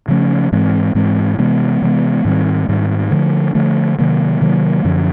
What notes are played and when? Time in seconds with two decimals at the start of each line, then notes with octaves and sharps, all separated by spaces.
0.08 C#3 F3 A3 C#4
0.52 G#2 E3 G#3 C4
0.95 G#2 E3 G#3 C4
1.38 C3 E3 G#3 B3
1.82 C3 E3 G#3 B3
2.25 G#2 D#3 G3 C4
2.68 G#2 D#3 G3 C4
3.11 D3 F3 A3
3.55 D3 F3 A3
3.99 C3 D#3 F#3 A#3
4.41 C3 D#3 F#3 A#3
4.85 F#2 D3 F3